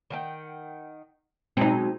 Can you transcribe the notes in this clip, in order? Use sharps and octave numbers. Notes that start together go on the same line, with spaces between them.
D#3 F#5 G5
B2 F#3 G#3 C4 D#4